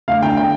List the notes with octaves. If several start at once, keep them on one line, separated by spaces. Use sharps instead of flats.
D2 F5
D3 G5
G5